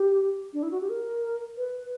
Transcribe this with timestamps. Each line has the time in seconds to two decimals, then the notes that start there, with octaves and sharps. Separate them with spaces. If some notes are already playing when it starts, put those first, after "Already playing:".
Already playing: G4
0.53 D4
0.63 E4
0.71 F#4
0.81 G4
0.90 A#4
1.57 B4